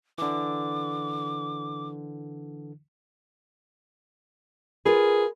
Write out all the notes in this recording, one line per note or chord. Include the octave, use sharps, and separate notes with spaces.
D3 E3 D6
F4 G#4 A#4 B4